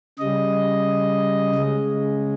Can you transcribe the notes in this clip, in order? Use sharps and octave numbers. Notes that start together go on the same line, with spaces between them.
C#3 G3 D#5
C#3 G#3